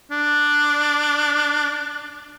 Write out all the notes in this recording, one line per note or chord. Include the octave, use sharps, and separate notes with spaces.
D4